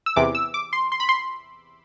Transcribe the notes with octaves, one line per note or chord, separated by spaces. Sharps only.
E6
E2 C3 E3 D6
E6
D6
C6
C6
B5
C6